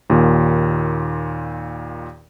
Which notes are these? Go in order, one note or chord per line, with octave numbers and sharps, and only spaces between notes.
D#2 A#2 D#3